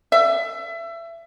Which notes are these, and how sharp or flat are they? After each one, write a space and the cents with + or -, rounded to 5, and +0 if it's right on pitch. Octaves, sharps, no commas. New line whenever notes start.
E5 +25